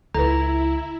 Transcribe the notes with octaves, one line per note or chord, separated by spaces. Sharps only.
C#2 E4 A4 B4 A#5